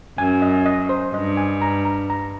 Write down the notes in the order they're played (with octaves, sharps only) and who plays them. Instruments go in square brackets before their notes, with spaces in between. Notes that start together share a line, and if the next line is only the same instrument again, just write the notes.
[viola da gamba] F#2 [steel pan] G#5
[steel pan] D#5
D#5
C5
[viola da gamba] G2 [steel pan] D#5
[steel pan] G#5
A#5
A#5
A#5